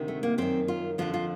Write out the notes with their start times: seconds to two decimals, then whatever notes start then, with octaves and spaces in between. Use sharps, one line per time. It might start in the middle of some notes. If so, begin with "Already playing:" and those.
Already playing: D2 C3 D#3
0.08 A3
0.23 A#3
0.38 F#2 D#3 C4
0.68 F4
0.98 F2 D3 F3 F4
1.14 F4